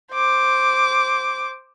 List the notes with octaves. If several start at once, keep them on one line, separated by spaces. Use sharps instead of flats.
C5 D6